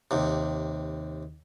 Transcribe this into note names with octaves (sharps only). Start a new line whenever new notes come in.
D#2 C3